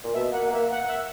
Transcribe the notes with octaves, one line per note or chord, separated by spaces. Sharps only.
A#2
B2 E5
A#3 F#5
A#3 E5
F#5
E5